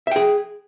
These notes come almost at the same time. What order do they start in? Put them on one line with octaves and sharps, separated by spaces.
E5 G5 G#4